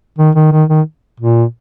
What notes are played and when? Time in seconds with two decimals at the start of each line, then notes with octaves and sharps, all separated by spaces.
0.18 D#3
0.35 D#3
0.52 D#3
0.69 D#3
1.20 A#2